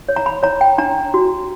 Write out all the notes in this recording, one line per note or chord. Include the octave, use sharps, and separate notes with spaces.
C#5
A#5
B5
C#5 A#5
G5
D4 A#5
F#4